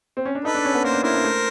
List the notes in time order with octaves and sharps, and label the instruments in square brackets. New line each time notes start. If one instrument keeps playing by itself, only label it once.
[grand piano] C4
C#4
D4
[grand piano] D#4 [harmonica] A4 B4
[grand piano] D4
C#4
B3
[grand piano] A#3 [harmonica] A#4 C5
[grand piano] D4
[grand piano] E4 [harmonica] A#4 C5
[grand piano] D4
A3